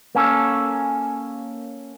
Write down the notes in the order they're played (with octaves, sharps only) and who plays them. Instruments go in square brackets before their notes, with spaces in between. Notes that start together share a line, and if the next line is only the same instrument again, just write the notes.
[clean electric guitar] A#3 C#4 A4